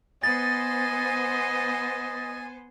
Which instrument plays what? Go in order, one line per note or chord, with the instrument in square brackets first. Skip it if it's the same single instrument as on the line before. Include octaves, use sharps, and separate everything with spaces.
[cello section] B3 C5 [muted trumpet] D#5 [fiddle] G#5 [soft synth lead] A6